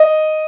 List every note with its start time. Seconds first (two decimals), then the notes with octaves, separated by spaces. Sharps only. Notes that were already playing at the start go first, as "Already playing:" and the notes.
Already playing: D#5